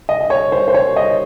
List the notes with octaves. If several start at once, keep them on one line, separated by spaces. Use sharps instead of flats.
D#5
D#5
C#5
C5
C5
C#5
D#5